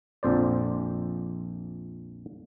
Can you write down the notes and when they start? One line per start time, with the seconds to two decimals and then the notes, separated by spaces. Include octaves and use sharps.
0.23 A#1 F2 C5 D5